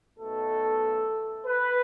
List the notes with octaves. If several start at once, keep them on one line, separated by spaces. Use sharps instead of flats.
B1 B2 A3 A4
B4